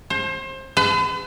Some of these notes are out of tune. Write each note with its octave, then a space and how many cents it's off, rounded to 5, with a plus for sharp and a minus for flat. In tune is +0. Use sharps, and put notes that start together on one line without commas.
C5 +30
B4 +45